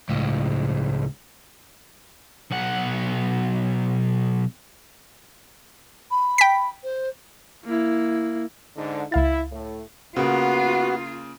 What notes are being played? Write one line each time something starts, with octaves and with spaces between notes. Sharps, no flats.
C#2 A2
B1 F#5
B5
G5 B6
C5
A#3 E4
G#2 D3
C#2 E4 F5 A6
A2
C#3 A#3 B3 F4 F#4